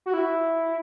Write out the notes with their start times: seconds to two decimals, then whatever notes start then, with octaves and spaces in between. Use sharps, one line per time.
0.06 F#4
0.14 E4